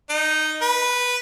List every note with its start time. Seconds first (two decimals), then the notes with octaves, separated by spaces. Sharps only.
0.09 D#4
0.62 B4